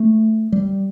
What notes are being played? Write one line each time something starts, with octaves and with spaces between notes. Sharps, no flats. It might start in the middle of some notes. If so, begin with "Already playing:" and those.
Already playing: A3
G3